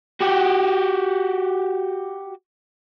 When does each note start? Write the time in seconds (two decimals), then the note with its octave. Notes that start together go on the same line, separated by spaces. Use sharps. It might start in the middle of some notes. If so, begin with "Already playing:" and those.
0.21 F#4 G4